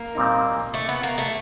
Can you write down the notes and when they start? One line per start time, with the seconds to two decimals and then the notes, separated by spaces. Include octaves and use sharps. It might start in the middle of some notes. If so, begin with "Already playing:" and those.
Already playing: A#3
0.15 A#2 G3 C4 D#4
0.74 A3
0.89 B3
1.03 A#3
1.18 A3